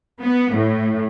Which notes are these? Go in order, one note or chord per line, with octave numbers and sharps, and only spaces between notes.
B3
A2